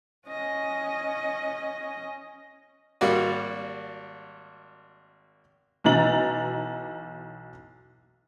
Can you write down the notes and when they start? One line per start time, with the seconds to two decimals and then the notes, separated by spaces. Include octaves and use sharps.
0.28 C#4 D#5
3.01 G#1 G3 A#3 F#4 D5
5.84 B1 E3 D#4 A#5 A6 F#7